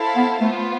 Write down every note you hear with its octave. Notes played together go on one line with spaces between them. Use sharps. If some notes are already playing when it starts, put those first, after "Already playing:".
Already playing: E4 A4 C5 F5 A5
B3
A3 B3 F4 C5